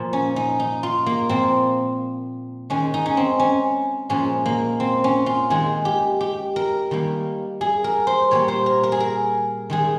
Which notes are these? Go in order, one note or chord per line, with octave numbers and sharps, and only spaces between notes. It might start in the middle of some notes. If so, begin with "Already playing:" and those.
Already playing: A#2 F3 A#3
C#4
D#4
D#4
F4
A#3
A#2 F3 A#3 C4
D#3 G#3 C#4
D#4
C#4
C4
C#4
A#2 F3 G#3 C#4
A#3
C4
C#4
F4
D#3 G#3 G#4
G4
G4
A#4
D#3 G3 A#3
G#4
A#4
C5
A#2 G3 A#3 C#5
C5
A#4
A#4
G#4
A#4
D#3 G#3 G#4